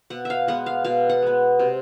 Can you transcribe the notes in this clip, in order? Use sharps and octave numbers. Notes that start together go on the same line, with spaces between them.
B2 F#5
E5 F5
G#3 B3 F#5
F5
B2 F5
F#5
G#3 B3
C3